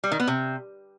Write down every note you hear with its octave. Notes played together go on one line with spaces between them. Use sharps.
G3
D#3
B3
C3